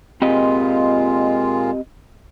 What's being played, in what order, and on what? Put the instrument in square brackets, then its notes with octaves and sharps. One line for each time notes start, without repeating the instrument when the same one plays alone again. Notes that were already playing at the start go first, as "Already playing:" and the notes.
[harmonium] A#2 G#3 F4 [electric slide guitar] C4 G4 D#5